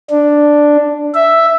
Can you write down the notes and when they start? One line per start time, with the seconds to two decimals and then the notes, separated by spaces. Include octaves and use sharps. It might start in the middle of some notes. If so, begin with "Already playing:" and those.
0.10 D4
1.15 E5